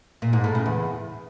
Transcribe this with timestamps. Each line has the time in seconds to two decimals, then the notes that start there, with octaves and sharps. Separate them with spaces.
0.22 A#2
0.33 G#2
0.44 A2
0.55 C#3
0.66 E2